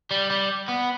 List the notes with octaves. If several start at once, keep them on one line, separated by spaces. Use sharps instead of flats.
G3
G3
B3